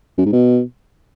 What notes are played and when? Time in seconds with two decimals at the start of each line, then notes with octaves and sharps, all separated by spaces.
0.18 F#2
0.25 G#2
0.33 B2